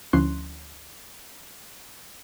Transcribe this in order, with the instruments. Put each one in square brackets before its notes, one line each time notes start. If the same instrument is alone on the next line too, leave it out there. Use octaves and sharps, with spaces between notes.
[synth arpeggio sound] D2 F3 C#4 E4 C6 F#6